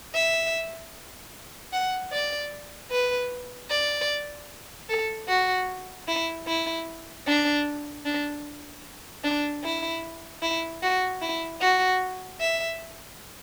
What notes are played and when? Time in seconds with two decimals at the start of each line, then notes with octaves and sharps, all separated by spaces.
0.15 E5
1.73 F#5
2.12 D5
2.91 B4
3.70 D5
4.89 A4
5.28 F#4
6.08 E4
6.47 E4
7.27 D4
8.05 D4
9.24 D4
9.64 E4
10.42 E4
10.83 F#4
11.22 E4
11.61 F#4
12.40 E5